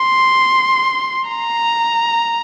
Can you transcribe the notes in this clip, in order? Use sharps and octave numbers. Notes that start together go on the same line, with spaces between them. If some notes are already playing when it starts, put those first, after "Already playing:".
Already playing: C6
A#5